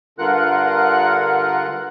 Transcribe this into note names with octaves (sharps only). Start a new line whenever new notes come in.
G2 D3 F4 A#4 F#5 F#6